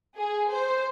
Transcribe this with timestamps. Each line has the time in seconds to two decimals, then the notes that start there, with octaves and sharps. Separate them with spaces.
0.16 G#4
0.51 C5